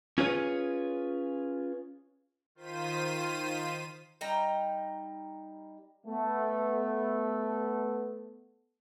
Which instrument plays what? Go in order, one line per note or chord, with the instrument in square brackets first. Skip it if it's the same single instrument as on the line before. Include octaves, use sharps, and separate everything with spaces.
[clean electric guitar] C#4 F4 G#4 B4 C#5
[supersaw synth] D#3 F4 C5 B6 D#7
[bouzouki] G3 D#4 G5 A#5
[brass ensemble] A3 B3